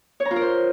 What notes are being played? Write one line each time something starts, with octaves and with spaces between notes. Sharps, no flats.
C#5
A#5
F4
A#4
C5